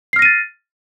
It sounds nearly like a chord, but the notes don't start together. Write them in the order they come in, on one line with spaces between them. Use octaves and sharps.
C7 F6 A#6 D#7 A6